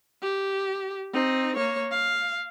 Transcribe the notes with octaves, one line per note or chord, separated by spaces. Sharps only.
G4
C4 D#4
A#3 C#5
F5